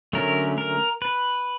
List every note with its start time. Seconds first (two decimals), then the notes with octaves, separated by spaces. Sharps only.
0.13 D3 F#3 A3 C#4 A#4
0.58 A#4
1.02 B4